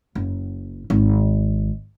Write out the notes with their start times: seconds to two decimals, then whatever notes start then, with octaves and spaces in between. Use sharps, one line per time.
0.15 F#1
0.90 G#1